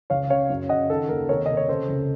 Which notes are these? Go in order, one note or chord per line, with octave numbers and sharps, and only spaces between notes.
C#2 C#5 F5
C#3 C#5 F5
F#2
C#3 D#5 F#5
D#3 A4
D#2 A#4
C3 A#4 C#5
C3 D#5
C#5
C#3 A4 C5
C#2